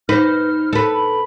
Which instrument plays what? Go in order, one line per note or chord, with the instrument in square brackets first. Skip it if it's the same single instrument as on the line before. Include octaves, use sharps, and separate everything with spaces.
[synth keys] D#4 C5 [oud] B4 [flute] F6
[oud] A4 B4
[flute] B5